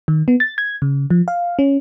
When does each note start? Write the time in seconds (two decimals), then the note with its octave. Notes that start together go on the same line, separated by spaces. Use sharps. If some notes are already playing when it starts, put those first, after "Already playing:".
0.08 D#3
0.28 B3
0.40 A6
0.58 G#6
0.82 C#3
1.10 F3
1.28 F5
1.59 C#4